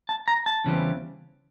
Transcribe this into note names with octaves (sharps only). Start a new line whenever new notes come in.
A5
A#5
A5
E2 C#3 E3 G3 C4